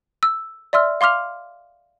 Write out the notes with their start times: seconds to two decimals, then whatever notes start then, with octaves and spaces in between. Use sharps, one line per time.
0.23 E6
0.73 D5 E5 C6 E6 F6
1.01 F5 C6 D6 F6 F7